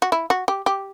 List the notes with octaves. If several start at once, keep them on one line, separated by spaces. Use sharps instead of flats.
F#4
E4
F#4
G4
G4